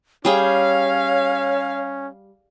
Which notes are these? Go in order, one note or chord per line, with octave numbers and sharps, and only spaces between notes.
G3 C#4 G#4 C#5 F5 G5